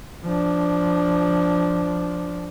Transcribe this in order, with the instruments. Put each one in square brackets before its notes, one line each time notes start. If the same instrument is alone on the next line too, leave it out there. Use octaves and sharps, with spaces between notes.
[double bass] F3 D4